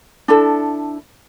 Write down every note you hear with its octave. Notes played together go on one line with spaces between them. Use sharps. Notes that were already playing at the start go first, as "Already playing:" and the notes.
D4 E4 A4